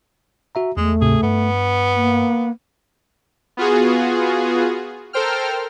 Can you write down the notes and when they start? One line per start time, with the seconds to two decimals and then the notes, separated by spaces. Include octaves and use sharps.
0.55 F#4 E5 A#5
0.77 E2 G#3 A3
1.01 D2 G#2 C3 G#4
1.23 G2 B3
1.95 A#3
3.57 B3 F4 F#4 G#4
5.13 A4 A#4 C5 G5 F6